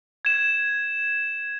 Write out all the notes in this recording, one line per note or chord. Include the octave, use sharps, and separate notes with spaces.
G#6 E7